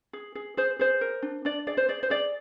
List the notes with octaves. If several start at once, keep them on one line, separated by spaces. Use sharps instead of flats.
G#4
G#4
G#4 C5
G#4 C5
A#4
D4
D4 D5
G#4 D5
C5
G#4 D5
C5
G#4 D5